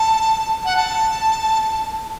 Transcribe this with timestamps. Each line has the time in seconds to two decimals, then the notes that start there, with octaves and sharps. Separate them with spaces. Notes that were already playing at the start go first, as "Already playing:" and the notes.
Already playing: A5
0.65 F#5
0.76 A5